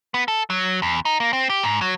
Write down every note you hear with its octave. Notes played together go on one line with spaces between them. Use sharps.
B3
A4
F#3
E2
D#4
A#3
C4
G4
G#2
F#3